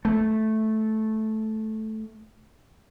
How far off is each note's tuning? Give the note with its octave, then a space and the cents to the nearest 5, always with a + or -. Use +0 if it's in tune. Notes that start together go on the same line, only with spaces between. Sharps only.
A3 -10